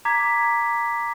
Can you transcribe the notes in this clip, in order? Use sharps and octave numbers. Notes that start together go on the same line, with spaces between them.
A#5 D6 G#6 B6